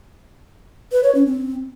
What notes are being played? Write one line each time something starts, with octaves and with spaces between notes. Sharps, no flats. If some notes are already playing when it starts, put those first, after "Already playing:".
B4
C#5
C#4
C4